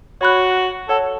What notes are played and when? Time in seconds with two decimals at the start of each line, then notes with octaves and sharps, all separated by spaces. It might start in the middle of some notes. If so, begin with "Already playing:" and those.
0.21 F#4 C#5 F#5 B5 F#6
0.89 A4 C#5 F#5 A5